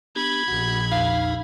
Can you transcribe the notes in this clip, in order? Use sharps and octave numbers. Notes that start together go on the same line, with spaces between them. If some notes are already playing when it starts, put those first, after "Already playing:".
B3 D4 G4 B5 G#6
A#1 F#4 F#5
E2 D#4 F5